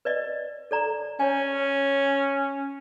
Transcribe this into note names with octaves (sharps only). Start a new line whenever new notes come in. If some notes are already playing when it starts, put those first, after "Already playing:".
B4 D5 D#5
A4 D5 A#5
C#4 C#5 G#5